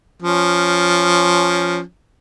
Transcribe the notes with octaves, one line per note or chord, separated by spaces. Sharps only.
F3 C#4